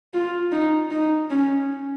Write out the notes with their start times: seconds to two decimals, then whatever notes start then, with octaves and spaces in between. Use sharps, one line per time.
0.14 F4
0.52 D#4
0.91 D#4
1.30 C#4